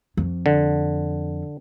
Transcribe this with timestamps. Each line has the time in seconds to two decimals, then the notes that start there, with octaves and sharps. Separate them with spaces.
0.17 F2
0.46 D3